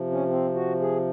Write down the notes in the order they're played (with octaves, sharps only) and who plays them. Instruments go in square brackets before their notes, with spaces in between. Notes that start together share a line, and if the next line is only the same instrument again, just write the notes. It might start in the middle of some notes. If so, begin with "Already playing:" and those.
Already playing: [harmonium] C3 F3
C#4
C4
F#4
G#4